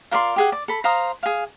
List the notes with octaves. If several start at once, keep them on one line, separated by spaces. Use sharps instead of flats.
F4 A#4 D5 C6
G4 G#4 F#5
D5
A4 B5
C5 F5 A#5 D#6
G#4 F5